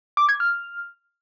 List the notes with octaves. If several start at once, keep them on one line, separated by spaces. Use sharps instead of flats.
D6
G#6
F6